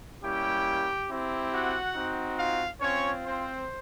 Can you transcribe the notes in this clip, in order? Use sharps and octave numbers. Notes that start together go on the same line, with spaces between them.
G3 A#3 C#4 E4 G4 G5
C4 E4 G4
F#4 F#5
C4 D#4 F#4
F4 F5
C4 C#4 F4 C#5
C4 C5